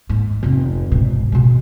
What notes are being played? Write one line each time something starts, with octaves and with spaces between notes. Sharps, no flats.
G#2
F1 B3
G#2 B2
B2 G#3